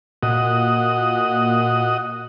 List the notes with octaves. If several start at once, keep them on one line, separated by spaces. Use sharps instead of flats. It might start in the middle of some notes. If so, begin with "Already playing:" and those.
A#2 F#4 D#5